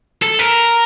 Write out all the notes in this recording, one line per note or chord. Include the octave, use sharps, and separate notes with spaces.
A4
A#4